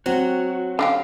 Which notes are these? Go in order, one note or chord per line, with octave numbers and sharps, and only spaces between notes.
F#3 C4 F#4
D3 F4 G4 F5